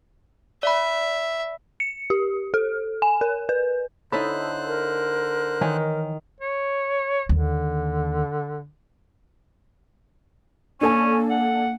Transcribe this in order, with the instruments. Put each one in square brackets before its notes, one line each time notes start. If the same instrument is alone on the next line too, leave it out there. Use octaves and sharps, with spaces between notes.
[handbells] D5 B5 [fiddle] E5
[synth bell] C#7
G4
A4
G#5
A#4
B4
[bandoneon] D3 C5 F#6 [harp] D#4 E4 A4 [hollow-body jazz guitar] C#5 B5
[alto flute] A#4
[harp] D#3 [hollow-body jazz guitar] E3 C#5 G#5
[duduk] C#5
[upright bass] D#2 [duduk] D3
[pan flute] A#3 [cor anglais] C#4 [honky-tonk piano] D4 A4 G#5
[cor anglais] F#5